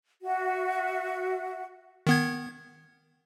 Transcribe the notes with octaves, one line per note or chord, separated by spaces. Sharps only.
F#4 E5 F#5
D#3 B3 G#6